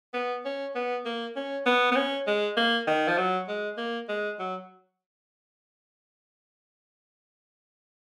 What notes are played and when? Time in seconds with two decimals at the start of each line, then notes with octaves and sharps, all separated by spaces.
0.14 B3
0.45 C#4
0.75 B3
1.05 A#3
1.36 C#4
1.66 B3
1.91 B3
1.96 C#4
2.27 G#3
2.57 A#3
2.87 D#3
3.08 F3
3.18 F#3
3.48 G#3
3.77 A#3
4.09 G#3
4.39 F#3